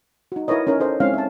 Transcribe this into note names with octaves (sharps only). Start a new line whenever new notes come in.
D#4 F#4
E4 A#4 B4 C#5 D#5
C#4 D#4 A#4 C#5
A4 C5 D#5
G#3 C4 C#4 D#4 E4 F5
E5 A5